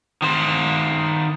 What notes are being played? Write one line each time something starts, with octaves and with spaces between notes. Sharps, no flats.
D#3 C5